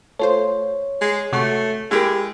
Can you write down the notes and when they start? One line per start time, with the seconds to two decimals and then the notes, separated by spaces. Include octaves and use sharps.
0.20 A3 F4 C5 C#5
1.01 G#3 C7
1.32 C3 A3 F#4 C7
1.91 G#3 E4 G4 A#4